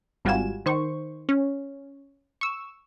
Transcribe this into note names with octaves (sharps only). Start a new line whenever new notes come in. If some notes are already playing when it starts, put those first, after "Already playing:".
G#1 G3 F4 F#4 G#5 E7
D#3 C5 C#6
C#4
C#6 E6